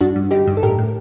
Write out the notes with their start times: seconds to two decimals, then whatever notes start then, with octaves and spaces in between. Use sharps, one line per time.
0.01 G2 D4 F#4
0.16 G2
0.31 D3 D#4 G4
0.47 G2
0.57 A4
0.63 A2 G4 A#4
0.78 A2